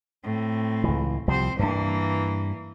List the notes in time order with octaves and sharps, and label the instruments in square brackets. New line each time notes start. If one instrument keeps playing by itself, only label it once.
[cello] A2 C4
[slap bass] C#2 E3
[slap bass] C2 F3 G3 [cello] C4 C5
[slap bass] G2 D4 [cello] E3 A#3